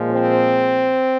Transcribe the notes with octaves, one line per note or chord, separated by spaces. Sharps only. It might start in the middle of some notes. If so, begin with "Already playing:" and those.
Already playing: A#2 F3 G#3
C4